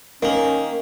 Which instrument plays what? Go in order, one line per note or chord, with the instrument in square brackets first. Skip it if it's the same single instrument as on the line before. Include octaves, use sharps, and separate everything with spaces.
[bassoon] D#3 [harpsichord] A#3 [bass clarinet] C#4